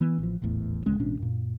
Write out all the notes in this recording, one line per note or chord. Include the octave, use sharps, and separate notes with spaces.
E3 B3
A1 F3
D#1 A1 E2 A2
D1 C#2 G#3 C#4
A1 B2 C#4 D4
F#2 A#2